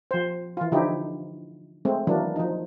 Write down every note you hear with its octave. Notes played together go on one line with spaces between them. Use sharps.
F3 C5
E3 F4
D3 F3 D#4 E4 G4
G#3 A3 C4
D#3 E3 F#3 A#3 D4
F3 D#4